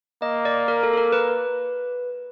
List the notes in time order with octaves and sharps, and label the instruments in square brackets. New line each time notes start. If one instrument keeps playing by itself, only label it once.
[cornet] A#3 [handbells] D#5
[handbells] D5
A#4
A4
A4
A#4
B4